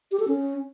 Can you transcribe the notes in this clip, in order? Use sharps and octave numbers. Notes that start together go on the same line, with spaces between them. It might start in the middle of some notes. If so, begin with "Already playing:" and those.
G4
A4
C#4